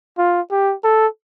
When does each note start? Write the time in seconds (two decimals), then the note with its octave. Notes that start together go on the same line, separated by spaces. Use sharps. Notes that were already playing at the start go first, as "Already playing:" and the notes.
0.18 F4
0.51 G4
0.84 A4